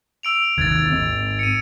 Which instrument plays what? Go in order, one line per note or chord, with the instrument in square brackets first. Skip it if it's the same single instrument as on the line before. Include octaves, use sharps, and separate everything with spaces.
[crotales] E6 D7 F7
[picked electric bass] G#1 D#2 [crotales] G#6 A6
[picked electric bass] G#2 C4
[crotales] C#7 D#7